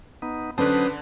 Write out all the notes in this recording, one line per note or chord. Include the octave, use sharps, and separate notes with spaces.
B3 D#4
D3 F#3 C#4 B4 C5 D5 A5 D#6